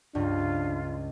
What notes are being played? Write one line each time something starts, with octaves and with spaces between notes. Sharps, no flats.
C#2 G2 D4 F4